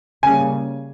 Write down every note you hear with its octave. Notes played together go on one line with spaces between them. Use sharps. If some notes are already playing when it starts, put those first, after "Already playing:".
C#3 G3 A#3 C#4 G#5